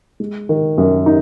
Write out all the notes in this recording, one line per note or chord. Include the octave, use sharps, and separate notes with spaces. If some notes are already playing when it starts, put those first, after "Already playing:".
G#3
D#3
F#2
D#4